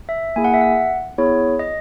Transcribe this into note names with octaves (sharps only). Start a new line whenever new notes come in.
E5
A#3 E4 G#4 G#5
F#5
E5
F#5
B3 E4 G#4 C#5
D#5